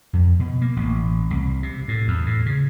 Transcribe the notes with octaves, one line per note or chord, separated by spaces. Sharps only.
F2
B2
A#3
A1
C2
C3
A2
E2
A2
C#3